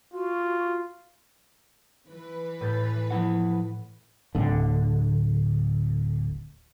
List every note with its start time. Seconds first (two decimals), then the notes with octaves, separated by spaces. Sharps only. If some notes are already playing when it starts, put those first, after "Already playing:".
0.13 F4 F#4
2.08 E3 B4
2.61 A2 G6 A6
3.11 F3 E4 F#5
4.35 D1 D3